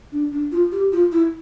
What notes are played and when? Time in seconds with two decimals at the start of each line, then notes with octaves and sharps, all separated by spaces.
0.12 D4
0.32 D4
0.52 F4
0.72 G4
0.92 F4
1.12 E4